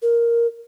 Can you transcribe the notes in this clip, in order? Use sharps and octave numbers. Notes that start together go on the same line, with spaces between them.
A#4